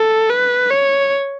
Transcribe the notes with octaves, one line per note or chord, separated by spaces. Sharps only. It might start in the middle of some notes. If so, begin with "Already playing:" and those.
Already playing: A4
B4
C#5